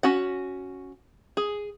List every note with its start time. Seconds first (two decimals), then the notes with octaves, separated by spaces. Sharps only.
0.03 C#4 F#4 F#5
1.37 G#4